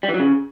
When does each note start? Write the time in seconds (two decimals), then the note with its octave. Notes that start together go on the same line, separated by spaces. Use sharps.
0.03 G3
0.09 E3
0.14 F#3
0.20 C#3